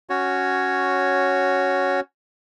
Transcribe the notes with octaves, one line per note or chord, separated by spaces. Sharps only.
C#4 F#4 C#5